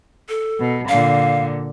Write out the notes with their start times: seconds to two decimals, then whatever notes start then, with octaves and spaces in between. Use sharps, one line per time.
0.29 A4
0.60 B2
0.89 A#2 D3 F5